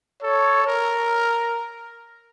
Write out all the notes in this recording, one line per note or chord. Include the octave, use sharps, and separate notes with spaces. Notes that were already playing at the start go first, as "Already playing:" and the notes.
A4 C#5
A#4